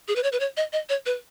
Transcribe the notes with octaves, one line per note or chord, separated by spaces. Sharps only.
G#4
B4
C#5
B4
C#5
D#5
D#5
C#5
B4